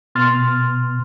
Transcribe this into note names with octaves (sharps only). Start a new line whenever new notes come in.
B2 B3 C6 F6 A6